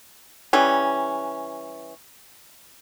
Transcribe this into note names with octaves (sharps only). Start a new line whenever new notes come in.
E3 G3 C#4